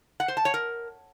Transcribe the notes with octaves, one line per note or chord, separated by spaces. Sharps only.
F#5
C5
A5
C#5
A#4